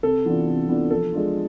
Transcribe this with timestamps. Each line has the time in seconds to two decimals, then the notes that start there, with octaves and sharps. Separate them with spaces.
0.03 C3 A4
0.25 E3 B3 D4 F4
0.47 C3
0.69 E3 B3 D4 F4
0.90 F3 A4
1.13 G#3 D4 F4